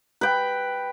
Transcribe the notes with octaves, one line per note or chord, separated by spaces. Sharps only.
B4 G5